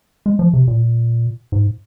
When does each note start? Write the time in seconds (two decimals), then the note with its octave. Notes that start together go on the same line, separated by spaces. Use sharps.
0.26 G#3
0.39 F3
0.53 C3
0.68 A#2
1.52 G#2